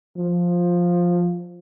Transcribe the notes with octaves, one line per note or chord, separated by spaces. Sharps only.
F3